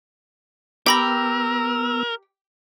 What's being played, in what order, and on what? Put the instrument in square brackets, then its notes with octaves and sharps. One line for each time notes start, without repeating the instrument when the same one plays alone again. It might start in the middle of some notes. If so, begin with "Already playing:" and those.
[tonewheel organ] B3 E6 [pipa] G4 [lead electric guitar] A#4 [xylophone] G5 B5 A#6